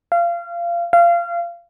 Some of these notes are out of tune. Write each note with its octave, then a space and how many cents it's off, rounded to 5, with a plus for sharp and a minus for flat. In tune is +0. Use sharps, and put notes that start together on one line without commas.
F5 -25
F5 -25